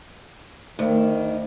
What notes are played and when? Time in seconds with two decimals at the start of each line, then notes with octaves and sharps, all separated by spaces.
0.79 D2 D#3